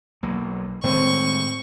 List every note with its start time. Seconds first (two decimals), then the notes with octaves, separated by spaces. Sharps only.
0.23 B1 F#3 A#3
0.84 A2 D#3 G#3 C4 C#6